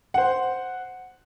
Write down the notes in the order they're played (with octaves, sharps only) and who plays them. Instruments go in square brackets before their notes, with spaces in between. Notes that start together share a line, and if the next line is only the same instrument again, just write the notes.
[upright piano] C5 F#5